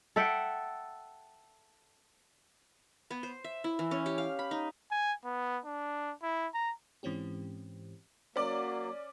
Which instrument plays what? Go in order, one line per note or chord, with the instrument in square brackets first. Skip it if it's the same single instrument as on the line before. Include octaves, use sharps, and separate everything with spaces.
[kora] A4 E5 F#5 G5
[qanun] B3
C5
E5
E4
E3
C#4
G4
F5
B5
D#4
[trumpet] G#5
B3
D4
E4
A#5
[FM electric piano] G#2 E3 C4 C#4 G4
[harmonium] F#3 A#3 [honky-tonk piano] C#4 D5